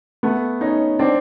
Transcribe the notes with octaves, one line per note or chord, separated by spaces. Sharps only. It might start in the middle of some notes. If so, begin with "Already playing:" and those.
A3 B3
C#4 D#4
C4 D4